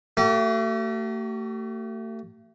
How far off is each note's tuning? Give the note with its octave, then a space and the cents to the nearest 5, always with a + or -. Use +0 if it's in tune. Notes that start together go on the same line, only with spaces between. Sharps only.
A3 +35 G4 -45